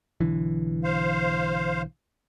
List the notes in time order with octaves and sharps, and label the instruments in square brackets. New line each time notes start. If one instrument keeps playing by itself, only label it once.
[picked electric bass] B1 D3 E3
[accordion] C5 F5